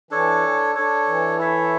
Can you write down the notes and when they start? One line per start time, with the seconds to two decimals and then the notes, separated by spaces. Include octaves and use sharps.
0.11 E3 D4 A4 C#5
0.75 D4 A4 C#5
1.06 E3
1.39 E4 A4 C#5 E5